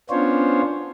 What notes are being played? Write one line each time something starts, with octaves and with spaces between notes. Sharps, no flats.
B3 C#4 D4 F4 C5 C#5